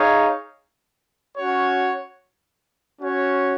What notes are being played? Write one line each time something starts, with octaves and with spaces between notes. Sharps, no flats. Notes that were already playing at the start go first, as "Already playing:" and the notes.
Already playing: D#4 G#4 C#5 F5
C#4 F#4 C#5
C#4 F#4 C#5